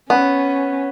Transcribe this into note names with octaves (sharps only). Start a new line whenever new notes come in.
B3 C#4